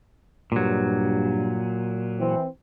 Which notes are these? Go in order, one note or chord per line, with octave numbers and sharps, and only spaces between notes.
G2 A#2 F#3
E3 C4